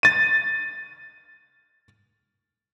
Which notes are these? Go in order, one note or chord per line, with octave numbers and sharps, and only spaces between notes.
A6 D#7